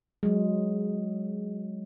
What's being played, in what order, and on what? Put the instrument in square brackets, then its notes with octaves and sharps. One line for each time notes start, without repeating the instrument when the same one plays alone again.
[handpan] F#3 G#3